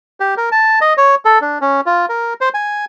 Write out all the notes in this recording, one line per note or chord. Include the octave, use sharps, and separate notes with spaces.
G4
A#4
A5
D#5
C#5
A4
D4
C#4
F4
A#4
C5
G#5